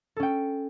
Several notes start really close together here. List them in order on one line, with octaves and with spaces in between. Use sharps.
A4 C#4 G5